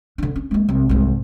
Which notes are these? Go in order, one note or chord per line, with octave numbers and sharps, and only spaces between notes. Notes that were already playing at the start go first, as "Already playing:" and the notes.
D3 D4
C#4
G#3 A#3
C2
C2 G#2